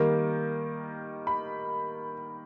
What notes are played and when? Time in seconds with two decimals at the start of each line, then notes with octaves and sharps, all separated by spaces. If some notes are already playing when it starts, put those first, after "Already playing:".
Already playing: D#3 G3 A#3
1.27 B5